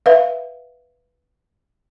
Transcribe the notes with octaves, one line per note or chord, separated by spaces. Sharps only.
B4 E5 F5